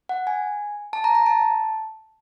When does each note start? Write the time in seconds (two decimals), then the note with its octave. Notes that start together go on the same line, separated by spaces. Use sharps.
0.09 F#5
0.27 G#5
0.93 A5
1.04 A#5
1.15 A#5
1.26 A5